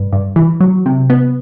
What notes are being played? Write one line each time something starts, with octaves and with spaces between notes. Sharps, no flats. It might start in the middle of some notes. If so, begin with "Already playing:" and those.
Already playing: G2
G2
E3
F#3
C3
B3